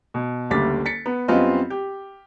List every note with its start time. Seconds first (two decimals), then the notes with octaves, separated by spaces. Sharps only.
0.14 B2
0.50 F#1 D2 G3 D6 A6 B6
0.85 A6 B6 C#7
1.06 B3
1.28 F#2 G3 B3 C4 F4 D#5
1.70 G4